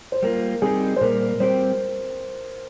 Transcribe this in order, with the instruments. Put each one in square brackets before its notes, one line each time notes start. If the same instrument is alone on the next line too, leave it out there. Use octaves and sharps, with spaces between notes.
[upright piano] C5
[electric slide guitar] G3 A#3 F4 [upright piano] A#4
[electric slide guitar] G3 C4 D#4 G4 [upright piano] G#4
[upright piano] C5
[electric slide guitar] A#2 G3 A#3 [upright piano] A#4
[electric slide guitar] G3 C4 G4 [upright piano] C5